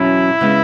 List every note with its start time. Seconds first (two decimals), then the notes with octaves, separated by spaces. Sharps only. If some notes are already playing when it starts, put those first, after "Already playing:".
Already playing: E2 B2 F#3 C#4 E4
0.41 C#3 G#3 B3